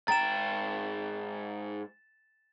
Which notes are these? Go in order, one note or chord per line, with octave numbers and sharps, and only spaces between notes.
G#2 G5 A#5 A6 E7